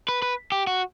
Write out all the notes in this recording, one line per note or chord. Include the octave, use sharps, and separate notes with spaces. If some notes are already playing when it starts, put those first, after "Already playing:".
B4
B4
G4
F#4